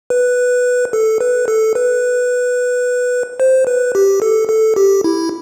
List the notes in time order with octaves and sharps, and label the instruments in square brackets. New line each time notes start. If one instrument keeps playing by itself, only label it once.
[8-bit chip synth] B4
A4
B4
A4
B4
C5
B4
G4
A4
A4
G4
E4